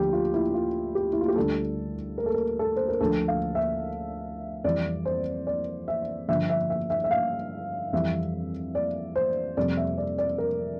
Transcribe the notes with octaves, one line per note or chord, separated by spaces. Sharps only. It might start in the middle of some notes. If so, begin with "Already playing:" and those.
Already playing: D2 D3 F3 G4
F4
E4
F4
G4
E4
F4
G4
D2 D3 G3 A4
A#4
A4
A#4
A4
C5
A#4
D2 D3 F3 A4
F5
E5
F2 E3 G3 D5
C5
D5
E5
G2 D3 F3 E5
E5
E5
E5
E5
F5
F2 E3 G3 E5
D5
C5
F2 C3 G3 D5
E5
D5
D5
A#4